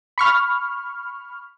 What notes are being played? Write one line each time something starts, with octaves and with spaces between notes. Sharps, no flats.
B5 C#6 F6